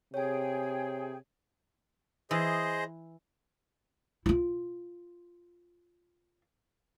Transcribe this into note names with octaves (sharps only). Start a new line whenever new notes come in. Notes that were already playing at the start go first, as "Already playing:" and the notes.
C3 G#4 C#5 G5 G#5
E3 G#4 C5 D#5
E4 F4